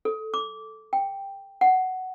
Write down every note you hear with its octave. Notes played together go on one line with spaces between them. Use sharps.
A4
D6
G5
F#5